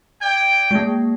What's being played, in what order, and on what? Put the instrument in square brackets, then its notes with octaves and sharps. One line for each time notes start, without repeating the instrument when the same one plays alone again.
[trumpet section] D5 G5 [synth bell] G#6
[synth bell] G#3 A#3